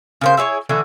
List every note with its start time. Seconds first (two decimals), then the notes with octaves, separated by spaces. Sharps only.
0.21 C#3 A#3 C5
0.37 E4 G#4 C5 C#5
0.69 D3 E3 A3